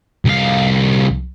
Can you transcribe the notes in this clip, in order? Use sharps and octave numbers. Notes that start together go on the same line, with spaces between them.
C2 F5